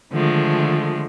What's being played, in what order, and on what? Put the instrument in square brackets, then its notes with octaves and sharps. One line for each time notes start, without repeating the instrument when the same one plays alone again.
[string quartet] D3 D#3 F3 G#3 A3